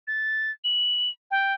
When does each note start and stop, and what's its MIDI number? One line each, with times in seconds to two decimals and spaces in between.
0.07 0.51 93
0.64 1.10 102
1.31 1.54 79